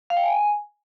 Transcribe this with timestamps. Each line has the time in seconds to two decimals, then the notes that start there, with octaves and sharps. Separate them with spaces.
0.10 F5
0.17 G5
0.23 G#5